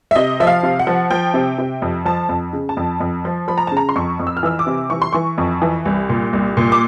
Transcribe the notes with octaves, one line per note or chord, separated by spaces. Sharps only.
E5
C3 D#5
F3 E5
F5
C3
F#5
F3
F3 G5
C3
C3
F2
F3 A5
F2
C#3
A5
F2
F2
F3
F3 B5
A#5
C#3 A5
A#5
C6
F2 C#6
F2
E6
F6
E3 E6
D6
C3
E3 C#6
C6
E3 C#6
F2
E3
C2
A#2
C2
A#2
D6